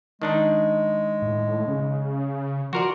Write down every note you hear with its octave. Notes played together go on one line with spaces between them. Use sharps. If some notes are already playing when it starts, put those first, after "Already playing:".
D#3 G#3 D4 D#4
A2
C#3
F3 F#4 A#4 D5 C6